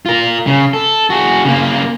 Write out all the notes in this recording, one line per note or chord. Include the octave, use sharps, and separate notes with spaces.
F4 A#4
C#3
A4
F#4 G#4
C#3 A#3